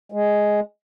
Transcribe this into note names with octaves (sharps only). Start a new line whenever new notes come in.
G#3